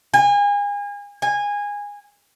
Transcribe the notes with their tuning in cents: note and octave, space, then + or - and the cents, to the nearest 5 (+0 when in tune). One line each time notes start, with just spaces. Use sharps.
G#5 -35
G#5 -20